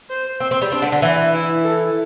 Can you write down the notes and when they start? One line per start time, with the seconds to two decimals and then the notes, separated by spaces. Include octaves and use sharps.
0.10 C5
0.40 C4
0.51 C4
0.62 G3
0.72 C4 D4
0.82 D3
0.92 D3
1.02 E3
1.34 E4
1.64 A4